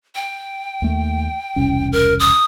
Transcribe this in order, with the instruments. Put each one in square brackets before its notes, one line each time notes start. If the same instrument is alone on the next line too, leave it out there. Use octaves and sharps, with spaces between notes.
[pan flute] G5
[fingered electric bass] D#2 A3
E1 C2 C#4
[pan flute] A#4
D#6